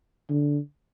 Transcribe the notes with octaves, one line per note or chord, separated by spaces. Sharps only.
D3